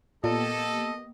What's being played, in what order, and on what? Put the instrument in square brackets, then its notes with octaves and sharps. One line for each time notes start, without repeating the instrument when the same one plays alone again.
[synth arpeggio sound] A#2 [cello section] A#3 B3 G4 [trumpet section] A4 [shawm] D#5